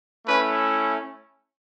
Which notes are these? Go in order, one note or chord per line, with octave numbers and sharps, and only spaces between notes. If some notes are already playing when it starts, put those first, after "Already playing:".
A3 C#4 E4 B4